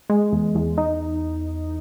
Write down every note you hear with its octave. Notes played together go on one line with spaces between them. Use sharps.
G#3
E2
E2
D#4